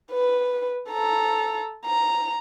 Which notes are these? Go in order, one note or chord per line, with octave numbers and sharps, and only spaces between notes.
B4
A4 A#5
A#5